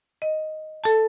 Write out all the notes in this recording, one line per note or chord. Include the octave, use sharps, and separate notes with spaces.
D#5
A4 A5